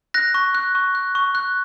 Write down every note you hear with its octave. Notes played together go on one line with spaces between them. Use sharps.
F#6 A#6
C#6
F#6
C#6
F#6
C#6
F#6